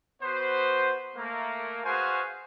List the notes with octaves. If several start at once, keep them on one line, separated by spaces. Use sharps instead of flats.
B3 F#4 B4 C5
A3 A#3
F#4 G#4 B4 C5 F5 G#5